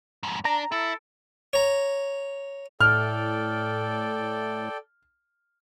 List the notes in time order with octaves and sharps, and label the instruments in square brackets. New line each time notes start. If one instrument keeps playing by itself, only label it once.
[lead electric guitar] F2 G#2
[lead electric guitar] D4 [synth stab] A#5
[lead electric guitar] E4 [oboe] A4
[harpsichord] C#5 A#5
[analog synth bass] A2 [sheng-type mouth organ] A4 D5 G5 [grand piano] F6